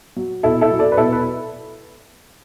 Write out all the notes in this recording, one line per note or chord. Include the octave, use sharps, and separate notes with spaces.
F#3
B2 E4 A4
E4 A4
F#3
A4 D5
B4
B2 E4 A4
B4